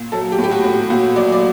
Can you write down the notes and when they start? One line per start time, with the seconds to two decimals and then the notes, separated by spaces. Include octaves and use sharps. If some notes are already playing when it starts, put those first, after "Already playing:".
Already playing: A#2
0.12 F#3 A4
0.32 G4
0.38 A2
0.44 G4
0.51 F#4
0.64 A2
0.90 A#2 F#4
1.16 F#3 D5
1.32 D5